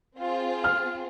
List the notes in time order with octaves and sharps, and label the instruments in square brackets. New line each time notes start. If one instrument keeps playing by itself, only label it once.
[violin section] C4 F4 G#4
[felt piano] F6